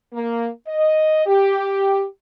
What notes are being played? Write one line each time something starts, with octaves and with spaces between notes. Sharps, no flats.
A#3
D#5
G4